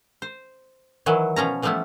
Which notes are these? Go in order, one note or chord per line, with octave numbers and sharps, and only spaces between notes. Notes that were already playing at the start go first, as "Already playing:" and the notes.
C5
D#3 E3 F#3
B2 F3 C#4 A#5
E3 F3 G3 A3 B3 E4